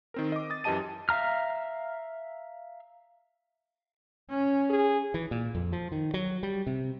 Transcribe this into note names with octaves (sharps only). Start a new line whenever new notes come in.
D#3 C4 A#4
D#5 D6
D#6 A6
F#2 E3 G4 D#5 A5 D#7
E5 F5 A#5 F6
C#4
G#4
E3
A#2
F2
F3
D#3
F#3
G3
C3